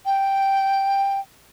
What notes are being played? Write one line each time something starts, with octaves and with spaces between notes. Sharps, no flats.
G5